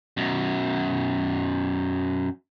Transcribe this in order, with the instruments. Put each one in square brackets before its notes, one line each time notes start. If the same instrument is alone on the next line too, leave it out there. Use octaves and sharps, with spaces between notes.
[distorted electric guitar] F#2 B2